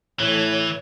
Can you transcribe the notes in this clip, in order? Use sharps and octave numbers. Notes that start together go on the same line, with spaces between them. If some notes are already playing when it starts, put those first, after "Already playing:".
A2 E3 C#5